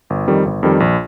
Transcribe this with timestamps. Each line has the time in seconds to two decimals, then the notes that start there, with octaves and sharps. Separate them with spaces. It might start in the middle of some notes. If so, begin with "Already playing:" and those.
0.10 G1
0.27 F2 D#3 G3
0.45 G1
0.63 F2 D#3 G3
0.80 A#1